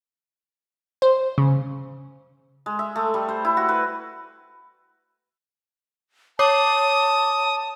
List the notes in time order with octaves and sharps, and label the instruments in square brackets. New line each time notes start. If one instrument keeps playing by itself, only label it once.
[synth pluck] C5
C#3
[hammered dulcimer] G#3
E5
A3
G3
C5
E4
F#4
B4
[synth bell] C#5 D6 [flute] A5 [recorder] D#6